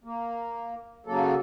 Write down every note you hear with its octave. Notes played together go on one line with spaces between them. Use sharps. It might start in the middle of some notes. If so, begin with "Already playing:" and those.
A#3
C#3 F#3 A#3 A4